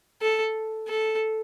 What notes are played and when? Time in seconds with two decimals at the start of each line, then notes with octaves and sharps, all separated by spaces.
0.22 A4
0.88 A4